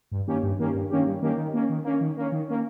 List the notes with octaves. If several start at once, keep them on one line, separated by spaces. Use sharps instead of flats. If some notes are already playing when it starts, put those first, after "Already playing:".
G2
D#3 A#3 C#4 G4
G2
D#3 A#3 C#4 G4
G2
D#3 A#3 C#4 G4
G2
D#3 A#3 C#4 G4
D#3
A#3 C#4
D#3
A#3 C#4
D#3
A#3 C#4
D#3
A#3 C#4